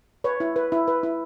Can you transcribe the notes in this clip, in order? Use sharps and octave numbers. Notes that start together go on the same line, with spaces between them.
B4 C#5
E4
B4
E4
B4
E4